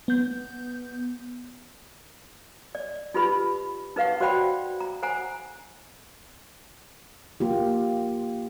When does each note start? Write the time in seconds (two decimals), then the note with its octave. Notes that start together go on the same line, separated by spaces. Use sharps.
0.08 B3 G6
2.75 D5
3.14 D#4 F4 G4 B4 B5
3.96 D#4 B4 F5 F#5 C#6
4.20 F#4 C5 D5 F#5 G5 B5
4.81 A#5
5.03 C5 F#5 G#5 A#5
7.40 A#3 F4 G4